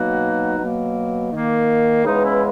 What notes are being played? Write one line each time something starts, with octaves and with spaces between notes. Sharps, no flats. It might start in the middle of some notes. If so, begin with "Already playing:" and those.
Already playing: B2 F#3 A#3 D#4 F#4
B2 F#3 A#3
D#3 A#3
C#3 E3 G#3 B3 D#4
C#4 E4